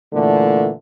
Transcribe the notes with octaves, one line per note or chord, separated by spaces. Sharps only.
A#2 D3 E3 A3